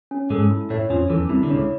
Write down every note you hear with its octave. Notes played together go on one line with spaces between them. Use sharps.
C#4
G#2 G#3 A4
E4
A2 A3 C#5
F2 F3 C#4
E2 E3 A4
C2 C3 E4
D3
C#2 C#3 C#5